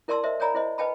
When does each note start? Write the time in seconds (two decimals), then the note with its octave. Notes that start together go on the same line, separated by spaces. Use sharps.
0.08 E4 A#4 D5 A5 C6 E6
0.23 A#4 C5 D#5 E5
0.40 A#4 C#5 D5 G#5 A#5 B5
0.55 E4 C5 D#5
0.78 B4 D#5 G5 A5 B5